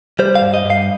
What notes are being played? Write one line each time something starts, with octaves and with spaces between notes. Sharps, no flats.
G3 C5
F5
G2
D#5
G2
F5